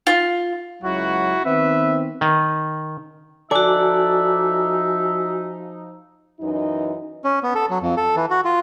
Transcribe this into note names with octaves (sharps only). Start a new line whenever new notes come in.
F4
C#2 F#3 E4 F#4
D#3 B3 C4 B4 E5
D#3
F3 D#4 F#4 A4 D5 E5 G#5
F#2 E3 D#4
C#4
B3
A4
F#3
F2
A4
E3
F#4
F4